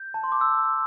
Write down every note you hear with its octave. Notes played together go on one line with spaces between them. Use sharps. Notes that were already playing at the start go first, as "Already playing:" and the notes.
Already playing: G6
A5
C6
D6
E6